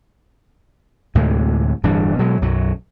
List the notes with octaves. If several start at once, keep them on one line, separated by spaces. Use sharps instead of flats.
D2 A2 C3 G#3
D1 G2 E3 D4
B2 F#3 G#3
B1 F#2 F#3